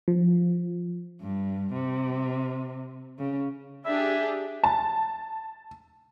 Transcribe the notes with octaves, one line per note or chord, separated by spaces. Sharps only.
F3
G2
C3
C#3
D4 G4 G#4 E5
A5